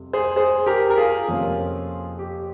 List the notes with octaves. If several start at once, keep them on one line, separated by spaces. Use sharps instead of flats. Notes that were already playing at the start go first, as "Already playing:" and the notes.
Already playing: F2 C3 G3
G#4 C5
G#4 C5
G4 A#4
A#4
F4 G#4
F2 C3 F3 A#3 C#4
G4